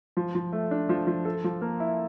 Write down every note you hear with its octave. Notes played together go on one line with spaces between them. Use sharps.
F3
F3
A3
D4
F3
F3
A4
F3
A#3
E4